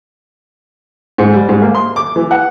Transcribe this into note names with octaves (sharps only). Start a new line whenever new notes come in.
G#2
G3
G#2
A#3
C6
D6
E3
F#5